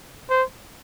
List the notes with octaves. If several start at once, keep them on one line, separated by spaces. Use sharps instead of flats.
C5